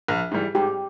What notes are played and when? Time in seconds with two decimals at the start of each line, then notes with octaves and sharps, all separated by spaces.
0.08 A#1
0.31 G#2 E3 G3
0.55 G#2 G4